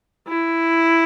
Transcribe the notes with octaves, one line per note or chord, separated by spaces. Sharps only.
E4